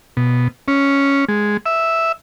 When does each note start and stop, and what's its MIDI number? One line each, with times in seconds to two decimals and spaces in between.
0.17 0.48 47
0.68 1.25 61
1.28 1.57 56
1.66 2.12 76